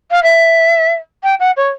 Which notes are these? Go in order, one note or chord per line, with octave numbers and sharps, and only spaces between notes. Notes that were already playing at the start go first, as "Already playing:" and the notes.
F5
E5
G5
F#5
C#5